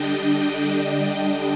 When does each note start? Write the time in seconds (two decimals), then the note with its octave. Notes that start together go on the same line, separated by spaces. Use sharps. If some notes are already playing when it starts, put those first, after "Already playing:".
Already playing: D3 G3 D4 D#5 G5
0.40 G5